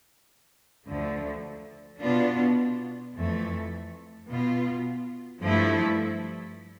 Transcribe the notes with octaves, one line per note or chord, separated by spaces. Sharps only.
D2 D3 F3 A3
B2 B3 D4 F4
F2 E3 A3
B2 B3 F4
G2 F3 A3 E4